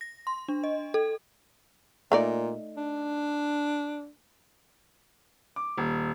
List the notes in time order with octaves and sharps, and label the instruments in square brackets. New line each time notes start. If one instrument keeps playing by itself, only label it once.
[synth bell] A#6
C6
D4
D#5
A4
[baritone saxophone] A#2 [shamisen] A3 D#4 D5
[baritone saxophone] D4
[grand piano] D6
D#1